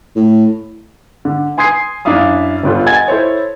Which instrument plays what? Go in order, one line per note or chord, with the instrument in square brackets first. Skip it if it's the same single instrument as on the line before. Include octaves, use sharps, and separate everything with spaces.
[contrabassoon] A2
[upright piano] D3
G#5 C6 D#6 G#6 C7
F#2 D4 E4 E5 F5 D#6
G1 G2 F4 A4
D#5 F#5 G#5 G#6 A6
E4 A4 C5 C#5